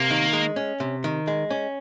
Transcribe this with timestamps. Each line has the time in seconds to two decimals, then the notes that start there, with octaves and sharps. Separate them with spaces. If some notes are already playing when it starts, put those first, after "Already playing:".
Already playing: C3 A#3
0.11 D#3
0.33 G#3
0.56 C#4
0.80 C3
1.04 D#3
1.27 G#3
1.50 C#4